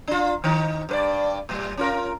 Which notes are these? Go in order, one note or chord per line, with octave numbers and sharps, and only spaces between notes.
D4 F4
D#3 D#4
G2 B4 D5
A2 G3
C#4 F4 A#4